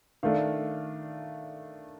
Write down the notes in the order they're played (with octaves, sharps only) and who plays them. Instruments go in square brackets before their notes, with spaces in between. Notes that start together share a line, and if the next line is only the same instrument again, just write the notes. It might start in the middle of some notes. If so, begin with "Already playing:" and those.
[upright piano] D#3 A3 D4 F5